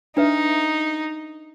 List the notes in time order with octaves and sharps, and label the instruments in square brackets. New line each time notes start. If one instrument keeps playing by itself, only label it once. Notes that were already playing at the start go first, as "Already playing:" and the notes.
[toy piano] D4 B4 E5 [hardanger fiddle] D#4